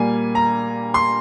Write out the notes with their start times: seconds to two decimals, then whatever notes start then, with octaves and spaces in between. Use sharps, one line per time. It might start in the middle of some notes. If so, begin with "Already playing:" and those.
Already playing: A#2 G3 A#3 G#5
0.35 A#5
0.94 C6